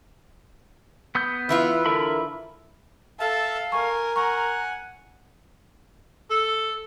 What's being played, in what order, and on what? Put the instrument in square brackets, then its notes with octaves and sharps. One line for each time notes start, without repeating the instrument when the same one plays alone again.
[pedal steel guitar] B3 D#6 G6
[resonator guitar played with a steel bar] E3 E4 F4 [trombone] B4
[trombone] D3 [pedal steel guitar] A#4 E5 B5
[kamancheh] A4 [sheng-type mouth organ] E5 A5 [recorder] F5
[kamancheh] A#4 [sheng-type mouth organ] G#5 [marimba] C#6
[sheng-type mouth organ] F#5 G#5 [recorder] A#5 [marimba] C#6
[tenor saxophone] A4